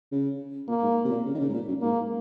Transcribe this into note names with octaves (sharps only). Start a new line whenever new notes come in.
C#3
A#2 A#3
G#2
C3
A#2
C#3
D#3
C#3
G#2
A#2
F#2
G#2 A#3